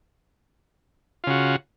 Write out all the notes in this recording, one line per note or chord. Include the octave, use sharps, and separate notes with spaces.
C#3 F4 F#4